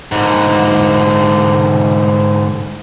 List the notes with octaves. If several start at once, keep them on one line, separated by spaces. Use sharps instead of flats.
G#2 D3